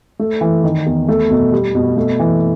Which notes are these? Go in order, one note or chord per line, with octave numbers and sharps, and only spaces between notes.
A3
E3
D#3
E2
A3
B2
G3
B2
A3
E3